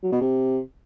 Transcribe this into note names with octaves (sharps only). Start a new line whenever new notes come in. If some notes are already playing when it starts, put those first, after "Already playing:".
F#3
B2
C3